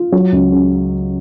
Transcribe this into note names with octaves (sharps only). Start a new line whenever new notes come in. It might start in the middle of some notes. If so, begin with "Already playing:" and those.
Already playing: F4
F#3
C#2
C#3